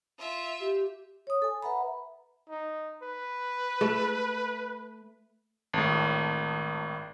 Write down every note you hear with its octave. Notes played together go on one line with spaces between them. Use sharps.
F4 E5
G4
C#5 D#6
A4 G#5
B4 E5 F#5 A#5 B5
D#4
B4
A3
G#1 A2